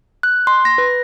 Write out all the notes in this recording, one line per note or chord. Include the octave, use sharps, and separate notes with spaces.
F#6
C6
A#6
B4